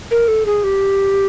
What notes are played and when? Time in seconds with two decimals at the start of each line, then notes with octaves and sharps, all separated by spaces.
0.11 A#4
0.28 A4
0.46 G#4
0.64 G4